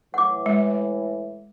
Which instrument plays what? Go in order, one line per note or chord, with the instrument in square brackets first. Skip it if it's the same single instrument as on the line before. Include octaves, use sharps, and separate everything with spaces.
[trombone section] A2 E3 [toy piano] F#5 D6
[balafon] G#3